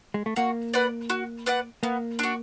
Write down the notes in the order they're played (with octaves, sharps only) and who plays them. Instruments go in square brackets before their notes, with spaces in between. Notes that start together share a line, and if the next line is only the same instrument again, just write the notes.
[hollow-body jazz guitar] G#3
A3
[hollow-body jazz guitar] A#3 [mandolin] F#4
[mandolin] B4 D5 F#5
F#4
B4 D5 F#5
[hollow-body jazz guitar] A#3 [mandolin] B3
[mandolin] D4 F#4